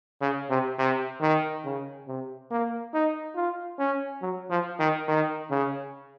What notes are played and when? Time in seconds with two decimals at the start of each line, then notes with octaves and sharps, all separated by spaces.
0.22 C#3
0.50 C3
0.79 C3
1.21 D#3
1.65 C#3
2.08 C3
2.51 A#3
2.94 D#4
3.36 F4
3.79 C#4
4.22 F#3
4.50 F3
4.80 D#3
5.08 D#3
5.51 C#3